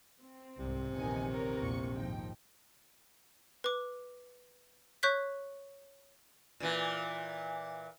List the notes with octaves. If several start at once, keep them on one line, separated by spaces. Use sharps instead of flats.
C4
C2 G#2 C3
A#1 E2 D#3 D#4 G#5 C#7
A#4 C#5
A#1 E2 A#3 C#6 C#7
D#2 G#2 F3 D#4 G5
B4 D6
C#5 C#6 F#6 G6 B6
A#2 E3